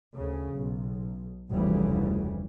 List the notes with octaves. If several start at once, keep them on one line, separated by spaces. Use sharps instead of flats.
D2 C#3
B1
F1 D2 C#3 E3 G3